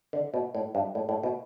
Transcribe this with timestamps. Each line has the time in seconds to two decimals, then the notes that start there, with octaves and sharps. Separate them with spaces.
0.13 D3
0.34 B2
0.55 A2
0.75 G2
0.95 A2
1.09 A2
1.23 B2